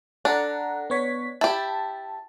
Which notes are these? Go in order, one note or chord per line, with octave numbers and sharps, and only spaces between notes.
D4 A4 F#5 A#5
B3 C#5 B6
E4 G4 A5